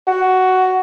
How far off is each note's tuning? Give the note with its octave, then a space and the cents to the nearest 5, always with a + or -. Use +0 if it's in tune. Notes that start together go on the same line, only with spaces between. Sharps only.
F#4 +10